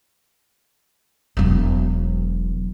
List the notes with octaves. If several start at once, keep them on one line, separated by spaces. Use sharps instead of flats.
E1 F#3